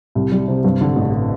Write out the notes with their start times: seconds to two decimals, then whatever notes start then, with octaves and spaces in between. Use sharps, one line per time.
0.15 C2
0.32 G3
0.48 C3
0.64 G2
0.81 D3
0.96 A1